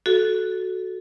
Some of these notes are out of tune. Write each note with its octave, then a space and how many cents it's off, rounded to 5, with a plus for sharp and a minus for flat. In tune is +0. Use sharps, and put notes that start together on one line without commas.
F#4 +0 A4 -15